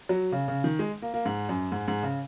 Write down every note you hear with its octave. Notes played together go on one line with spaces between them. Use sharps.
F#3
C#3
C#3
D#3
G#3
A#3
A#3
G#2
F#2
G#2
G#2
C#3